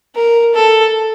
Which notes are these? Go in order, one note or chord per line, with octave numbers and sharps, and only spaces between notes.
A#4
A4